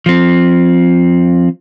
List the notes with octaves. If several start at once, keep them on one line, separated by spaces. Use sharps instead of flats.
F3 C4